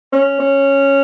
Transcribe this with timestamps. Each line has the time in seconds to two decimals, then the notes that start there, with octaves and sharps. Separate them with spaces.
0.13 C#4
0.40 C#4